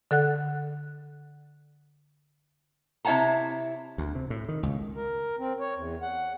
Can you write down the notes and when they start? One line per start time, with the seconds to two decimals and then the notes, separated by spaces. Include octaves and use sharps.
0.11 D3 A4 F#5 F#6
3.05 C3 E4 C#5 F#5 A5 A#5
3.98 D2
4.15 C3
4.30 A2
4.49 D#3
4.63 C#2
4.96 A#4
5.39 C4
5.60 C#5
5.76 E2
6.02 F#5